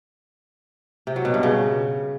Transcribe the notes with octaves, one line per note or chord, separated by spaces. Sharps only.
C3
F#3
B2
G2
C#3